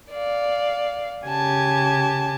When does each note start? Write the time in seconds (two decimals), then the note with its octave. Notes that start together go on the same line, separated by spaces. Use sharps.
0.11 D5 F5
1.25 C#3 G4 G#5 A5 G#6